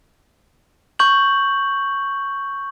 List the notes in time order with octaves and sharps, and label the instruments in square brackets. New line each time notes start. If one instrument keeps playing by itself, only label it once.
[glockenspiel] C#6 G6 F#7